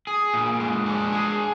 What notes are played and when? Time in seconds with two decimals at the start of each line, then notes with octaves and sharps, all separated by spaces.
0.07 G#4
0.34 A#2
0.60 G#3
0.86 D4
1.12 G#4